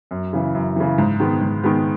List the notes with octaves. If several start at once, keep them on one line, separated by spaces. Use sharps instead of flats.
F#2
C#3 E3
F#2
C#3 E3
G#2
D#3 G#3 B3
G#2
D#3 G#3 B3